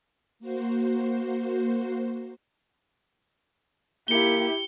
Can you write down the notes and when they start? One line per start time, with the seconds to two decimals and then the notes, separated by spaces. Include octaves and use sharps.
0.40 A#3 F#4 C5
4.08 A#3 E4 G4 C#7 G7